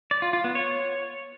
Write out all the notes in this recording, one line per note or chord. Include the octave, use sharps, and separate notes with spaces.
D5
F4
F4
B3
C#5